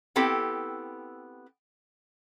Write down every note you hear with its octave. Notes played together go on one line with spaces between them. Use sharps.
B3 C4 E4 G4 A4 G5